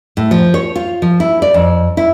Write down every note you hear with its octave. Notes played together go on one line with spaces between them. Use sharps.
A2
F3
C#5
F4
F3
E4
D5
F2
E4